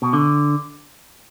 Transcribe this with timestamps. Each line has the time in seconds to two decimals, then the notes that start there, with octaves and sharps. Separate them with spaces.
0.02 B2
0.13 D3